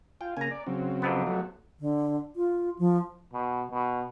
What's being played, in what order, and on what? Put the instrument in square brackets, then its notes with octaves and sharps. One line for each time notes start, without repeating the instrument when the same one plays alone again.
[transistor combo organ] F4 [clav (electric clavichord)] G5
[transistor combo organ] C#3 A#3 [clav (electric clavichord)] G#5 A#5
[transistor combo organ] D5
C#3 F#3 C4
[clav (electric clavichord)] F2 C3 B3
[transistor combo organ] F#3 A3
[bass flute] D3
F4
F3
[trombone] B2
B2